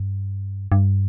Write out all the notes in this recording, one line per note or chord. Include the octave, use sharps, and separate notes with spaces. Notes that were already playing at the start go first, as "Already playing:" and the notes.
Already playing: G2
G2